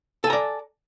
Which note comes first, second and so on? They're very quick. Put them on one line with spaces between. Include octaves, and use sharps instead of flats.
A4 G#5 A#5 D5